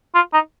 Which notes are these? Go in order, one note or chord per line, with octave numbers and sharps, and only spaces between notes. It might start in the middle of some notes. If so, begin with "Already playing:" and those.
F4
D#4